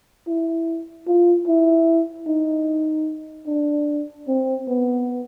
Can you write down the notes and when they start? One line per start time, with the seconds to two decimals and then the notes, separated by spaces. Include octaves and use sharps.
0.27 E4
1.07 F4
1.48 E4
2.27 D#4
3.47 D4
4.28 C4
4.68 B3